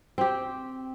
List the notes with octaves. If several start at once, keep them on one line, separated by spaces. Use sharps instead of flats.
C4 G4